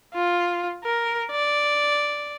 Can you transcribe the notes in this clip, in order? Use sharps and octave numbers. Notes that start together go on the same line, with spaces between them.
F4
A#4
D5